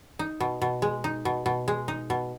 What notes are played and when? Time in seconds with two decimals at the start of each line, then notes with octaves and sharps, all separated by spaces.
0.19 D#4
0.40 B2
0.62 B2
0.82 G#3
1.04 D#4
1.25 B2
1.46 B2
1.68 G#3
1.88 D#4
2.10 B2